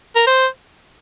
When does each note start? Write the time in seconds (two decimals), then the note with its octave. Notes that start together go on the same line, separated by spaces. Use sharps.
0.16 A#4
0.27 C5